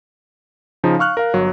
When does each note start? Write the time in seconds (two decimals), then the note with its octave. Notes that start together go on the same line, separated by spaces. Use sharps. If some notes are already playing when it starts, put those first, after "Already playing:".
0.84 C#3 F3 D#4
0.99 F5 C#6 F6 F#6
1.17 A#4 F5
1.34 G1 F#3